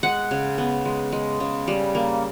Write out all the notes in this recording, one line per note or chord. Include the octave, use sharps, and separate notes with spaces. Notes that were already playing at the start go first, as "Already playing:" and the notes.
G#3 F#5
C#3
B3
G#3
G#3
C#3
G3
A#3